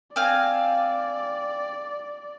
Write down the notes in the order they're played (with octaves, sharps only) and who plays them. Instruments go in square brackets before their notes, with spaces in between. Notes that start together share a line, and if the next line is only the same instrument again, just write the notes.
[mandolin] C4 F5 G#5 [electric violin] D5